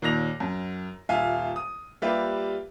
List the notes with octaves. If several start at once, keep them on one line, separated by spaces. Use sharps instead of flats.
D#2 A#2 A#6 F7
F#2
D#1 F4 E5 F5 G#5
D#6
G3 A#3 F4 G4 B4 E5